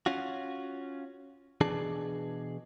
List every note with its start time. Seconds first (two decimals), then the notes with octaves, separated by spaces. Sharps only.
0.06 C#4 F4 F#4
1.61 B2 E3 D4 G#4 A5